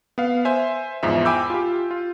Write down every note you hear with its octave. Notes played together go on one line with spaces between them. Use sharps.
B3 F5
C5 E5 G#5
E2 G#2 F3 E5
G5 G#5 B5 D6 E6 G6
F4 G4
F4